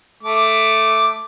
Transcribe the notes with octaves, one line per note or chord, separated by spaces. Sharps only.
A3 D6